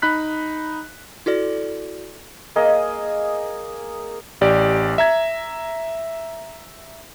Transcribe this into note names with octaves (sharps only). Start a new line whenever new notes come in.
D#4 B5 F#6 B6
E4 F#4 A4 D5
A#3 G#4 D#5
A1 G4 D5
E5 A#5 G#6